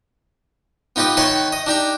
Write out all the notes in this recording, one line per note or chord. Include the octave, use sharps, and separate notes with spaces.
B3 D#4 F4 G4 B4
D#3 B4 C#5 F#5 C6
D#5 D#6
D4 D#4 G4 A#5